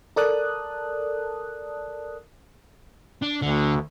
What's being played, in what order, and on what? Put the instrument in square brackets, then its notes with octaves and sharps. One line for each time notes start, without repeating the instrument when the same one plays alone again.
[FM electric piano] A4 A#4 D5 A5 D#6 F#6
[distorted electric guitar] D4
[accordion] D2 [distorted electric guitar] D3